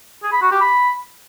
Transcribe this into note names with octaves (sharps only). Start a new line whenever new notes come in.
G#4
B5
F#4
G4
B5